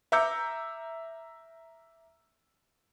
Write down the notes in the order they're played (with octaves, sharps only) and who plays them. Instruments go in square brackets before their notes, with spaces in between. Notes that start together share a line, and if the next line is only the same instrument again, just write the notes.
[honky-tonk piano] E5 A#5 D6 E6 G6 C#7